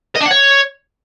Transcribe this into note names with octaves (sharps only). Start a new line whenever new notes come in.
D#5
D4
F#5
C#5